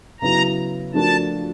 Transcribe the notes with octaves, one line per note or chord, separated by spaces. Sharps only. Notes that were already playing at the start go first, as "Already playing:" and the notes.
C#3 F#3 B3 E4 A#5
F3 A3 D4 F#4 A#4 A5